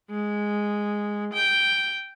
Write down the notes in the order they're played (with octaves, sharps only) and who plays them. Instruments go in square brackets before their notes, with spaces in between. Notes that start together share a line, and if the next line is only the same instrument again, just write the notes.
[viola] G#3
G5